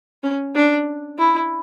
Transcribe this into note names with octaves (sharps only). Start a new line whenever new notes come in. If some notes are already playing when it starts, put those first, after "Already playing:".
C#4
D4
E4